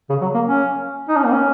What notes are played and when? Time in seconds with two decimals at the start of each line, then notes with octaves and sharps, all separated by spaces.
0.10 C#3
0.21 F#3
0.34 A#3
0.46 C#4
1.08 D#4
1.17 C#4
1.25 A#3
1.33 C#4